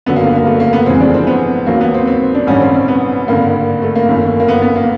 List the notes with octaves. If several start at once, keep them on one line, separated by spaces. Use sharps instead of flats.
G1 F#2 D3 F#3 B3
A#3
B3
A#3
A3
A#3
B3
F1 F2 C3 E3 G#3 C4
D4
C4
B3
D#2 D#3 F#3 A#3
B3
C4
C4
D4
A1 G2 D#3 G3 C#4
C4
C4
B3
G#1 G2 D3 A#3
A3
A#3
G1 F#2 D#3
A#3
B3
B3
A#3